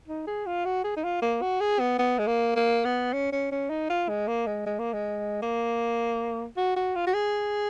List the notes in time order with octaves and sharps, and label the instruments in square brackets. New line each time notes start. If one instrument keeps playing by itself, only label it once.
[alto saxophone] D#4
G#4
F4
F#4
G#4
D#4
F4
A#3
F#4
G#4
B3
B3
G#3
A#3
A#3
B3
C#4
C#4
C#4
D#4
F4
G#3
A#3
G#3
G#3
A#3
G#3
A#3
F#4
F#4
F4
F#4
G#4